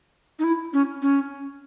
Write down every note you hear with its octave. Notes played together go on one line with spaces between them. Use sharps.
D#4
E4
C#4
C#4